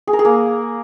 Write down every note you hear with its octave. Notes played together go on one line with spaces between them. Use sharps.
G#4
A#4
G#4
A#3